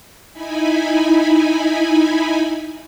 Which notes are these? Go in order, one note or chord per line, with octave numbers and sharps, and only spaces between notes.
D#4 E4 G#5 B5